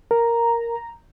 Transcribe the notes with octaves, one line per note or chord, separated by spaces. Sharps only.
A#4 A#5